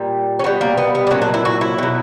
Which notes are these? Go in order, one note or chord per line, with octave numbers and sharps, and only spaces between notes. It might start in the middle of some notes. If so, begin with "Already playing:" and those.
Already playing: A#2 G3
C#4
B2 G3 B3
A#3
B3
B3
D4
A#2 F#3 C#4
D4
E4
F#4
E4
B2 F#3